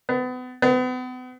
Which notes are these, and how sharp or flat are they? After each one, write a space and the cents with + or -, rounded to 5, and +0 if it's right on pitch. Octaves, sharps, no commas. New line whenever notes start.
B3 +35
B3 +40